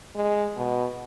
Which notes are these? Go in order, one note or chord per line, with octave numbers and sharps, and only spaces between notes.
G#3
B2